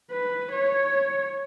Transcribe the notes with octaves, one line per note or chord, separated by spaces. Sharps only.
B4
C#5